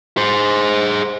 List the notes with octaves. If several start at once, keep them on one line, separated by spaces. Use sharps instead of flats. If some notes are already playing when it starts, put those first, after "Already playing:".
G#4 C5